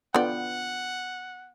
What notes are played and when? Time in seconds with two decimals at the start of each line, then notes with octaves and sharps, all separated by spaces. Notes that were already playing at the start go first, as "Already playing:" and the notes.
0.14 D3 B3 F4 D5 F#5 G5